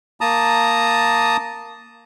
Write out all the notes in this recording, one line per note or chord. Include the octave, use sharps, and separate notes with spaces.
A#3 A5 A#5 D#6